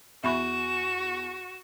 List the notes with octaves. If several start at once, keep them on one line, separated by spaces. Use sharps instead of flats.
E2 F#4 E5 B5 C#6 E7